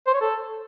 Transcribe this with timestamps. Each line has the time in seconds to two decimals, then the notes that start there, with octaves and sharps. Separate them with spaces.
0.07 C5
0.14 C#5
0.21 A4